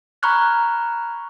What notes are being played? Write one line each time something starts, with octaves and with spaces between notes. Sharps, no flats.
A#5 B5 C#6 F6 F#6 G#6